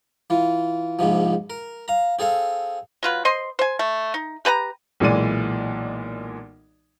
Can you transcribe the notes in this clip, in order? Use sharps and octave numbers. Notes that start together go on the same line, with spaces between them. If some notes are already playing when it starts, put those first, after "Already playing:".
E3 F4
A#1 G#2 C3 F3
A#4
F5 A#5
C4 G#4 A4 F5
F#3 F4 B4
C5 D#5 C6
C5 G#5
A3
D#4
G4 B4 A5 A#5
B1 A#2 E3 G#3 D5 D#7